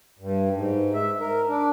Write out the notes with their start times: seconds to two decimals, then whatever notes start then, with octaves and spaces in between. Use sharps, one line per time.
0.19 G2
0.54 G#2
0.94 E5
1.20 A#4
1.48 D4